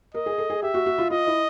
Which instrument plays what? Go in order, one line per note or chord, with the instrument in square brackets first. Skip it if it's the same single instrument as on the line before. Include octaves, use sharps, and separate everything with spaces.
[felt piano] A#4 [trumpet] D#5
[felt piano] G#4
A4
G#4
[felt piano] G4 [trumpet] E5
[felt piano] F#4
F#4
F4
[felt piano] F4 [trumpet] D#5
[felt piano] E4